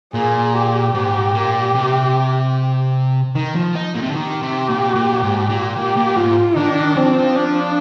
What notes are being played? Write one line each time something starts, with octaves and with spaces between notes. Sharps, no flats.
A#2 G#4
G4
G#2
A#2
C3
D#3
F3
D#4
A#2
C3
D3
D#3 G4
C3
A#2
A#2
G#2
A#2
A#2 G4
A#2
G#2 F4
D#3 D4
F3 C4
D4